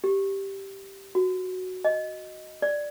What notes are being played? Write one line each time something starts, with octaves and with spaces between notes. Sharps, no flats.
G4
F#4
D#5
D5